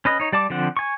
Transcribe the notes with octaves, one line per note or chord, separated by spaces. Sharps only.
C#4 B4 D#5
D#4 C#5
G3 D5 A5 D6
D3 F3 C4 F#5
G#5 C#6